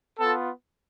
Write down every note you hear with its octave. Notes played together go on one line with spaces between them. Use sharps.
B3 F4 A4 A5